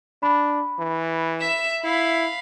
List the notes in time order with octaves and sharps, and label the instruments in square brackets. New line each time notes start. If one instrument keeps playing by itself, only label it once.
[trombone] D4 [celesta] B5
[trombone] E3
[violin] E5 E7
[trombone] E4 [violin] F5 B5